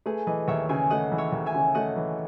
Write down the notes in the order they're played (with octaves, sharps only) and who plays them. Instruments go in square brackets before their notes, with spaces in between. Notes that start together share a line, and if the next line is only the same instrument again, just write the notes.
[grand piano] A3 [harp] G#4 B4
[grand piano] E3 [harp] B4 D#5
[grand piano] D#2 [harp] C#5 E5
[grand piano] C#3 [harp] E5 G#5
[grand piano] A3 [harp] D#5 F#5
[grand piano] E3
[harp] C#5 E5
[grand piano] D#2
[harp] E5 G#5
[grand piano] C#3
[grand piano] A3 [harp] D#5 F#5
[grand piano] E3